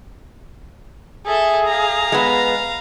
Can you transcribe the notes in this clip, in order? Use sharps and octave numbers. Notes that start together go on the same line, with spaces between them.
G#4 A4 E5
F5 A#5
G#3 B3